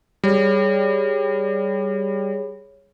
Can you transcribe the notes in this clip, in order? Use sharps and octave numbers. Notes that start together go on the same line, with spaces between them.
G3 G#4 C#5